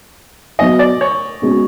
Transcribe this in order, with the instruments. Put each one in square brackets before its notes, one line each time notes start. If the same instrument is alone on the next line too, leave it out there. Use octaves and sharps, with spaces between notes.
[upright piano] B2 F#3 B3 D#4 [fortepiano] D#5
[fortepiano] D5
C#5
[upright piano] B2 G#3 C#4